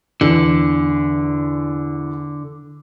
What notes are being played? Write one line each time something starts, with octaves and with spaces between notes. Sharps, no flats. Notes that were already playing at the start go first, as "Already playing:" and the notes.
E2 D3